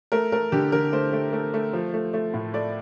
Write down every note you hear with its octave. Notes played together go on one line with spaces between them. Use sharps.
A3 A#4
A3 A#4
D3 G4
D3 A#4
A3 C5
A3
A3
A3
F3
A3
A3
A2
A3 D5